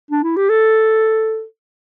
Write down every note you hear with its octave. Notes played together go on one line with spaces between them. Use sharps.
D4
E4
G4
A4